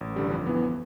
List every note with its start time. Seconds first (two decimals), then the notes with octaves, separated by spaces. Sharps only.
0.01 A1
0.16 G2 D3 G3
0.31 F2
0.46 E3 B3